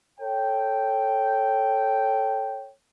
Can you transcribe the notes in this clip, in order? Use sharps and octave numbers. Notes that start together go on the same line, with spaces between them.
A4 C#5 G5